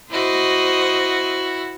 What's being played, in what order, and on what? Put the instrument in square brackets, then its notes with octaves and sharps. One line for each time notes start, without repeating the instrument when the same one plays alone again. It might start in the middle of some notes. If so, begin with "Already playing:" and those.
[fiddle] E4 F#4 [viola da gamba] C5 D#5